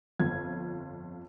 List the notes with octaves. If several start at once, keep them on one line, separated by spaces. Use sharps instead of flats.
G1 F2 F4 G#6